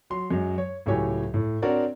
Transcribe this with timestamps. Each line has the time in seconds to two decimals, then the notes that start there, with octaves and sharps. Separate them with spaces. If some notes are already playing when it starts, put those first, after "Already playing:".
0.10 F#3 C6
0.31 F#2 F#3 G#3
0.58 C#5
0.86 C#2 A2 F#3 G4 C#5 G#5
1.34 A2
1.62 C4 D4 F#4 A#4 C#5 D5